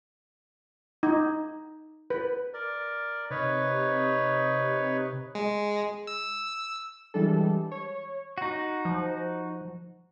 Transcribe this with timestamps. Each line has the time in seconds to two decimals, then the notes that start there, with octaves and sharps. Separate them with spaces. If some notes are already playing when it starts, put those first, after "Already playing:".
1.03 D#4
2.10 B4
2.54 A#4 D5
3.30 C3 D#4 B4 C#5
5.35 G#3
6.07 E6
7.14 E3 G3 G#3 D4 A4
7.71 C#5
8.38 D#4 F#4
8.85 F3